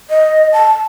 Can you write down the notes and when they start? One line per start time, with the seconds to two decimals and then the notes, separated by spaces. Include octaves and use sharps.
0.10 D#5
0.53 A5